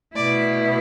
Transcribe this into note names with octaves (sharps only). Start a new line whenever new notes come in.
B2 A3 E4 D5